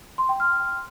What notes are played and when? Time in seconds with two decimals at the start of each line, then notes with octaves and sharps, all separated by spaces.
0.18 C6
0.29 G5
0.40 F6